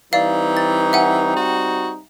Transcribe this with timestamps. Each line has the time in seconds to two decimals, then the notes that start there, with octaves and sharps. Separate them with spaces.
0.13 E3 G3 C4 D#4 D5 F5
0.57 A6
0.93 E5 F#5 G#5
1.36 F#4